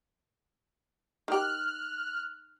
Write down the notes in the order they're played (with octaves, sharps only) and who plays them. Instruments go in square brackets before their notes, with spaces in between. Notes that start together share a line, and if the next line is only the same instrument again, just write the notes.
[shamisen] D#3 G4 [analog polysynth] F6 F#6